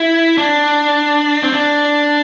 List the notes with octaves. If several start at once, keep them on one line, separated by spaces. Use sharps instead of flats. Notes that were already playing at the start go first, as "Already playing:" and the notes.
Already playing: E4
D4
C4
D4